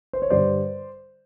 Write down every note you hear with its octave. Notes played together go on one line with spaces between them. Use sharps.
C5
C#5
G2 D3 G3 C5 D5